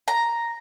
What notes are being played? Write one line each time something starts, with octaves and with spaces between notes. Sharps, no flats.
A#5